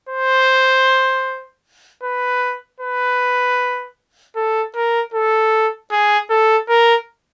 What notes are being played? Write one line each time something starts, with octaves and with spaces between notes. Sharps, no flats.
C5
B4
B4
A4
A#4
A4
G#4
A4
A#4